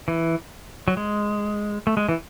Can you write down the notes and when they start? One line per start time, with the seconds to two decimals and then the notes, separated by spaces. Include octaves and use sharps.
0.08 E3
0.88 F#3
0.97 G#3
1.87 A3
1.97 G#3
2.09 E3